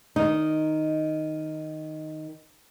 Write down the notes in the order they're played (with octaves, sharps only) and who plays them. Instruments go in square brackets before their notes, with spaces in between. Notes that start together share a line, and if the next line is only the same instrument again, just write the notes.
[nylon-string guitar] D#3 D#4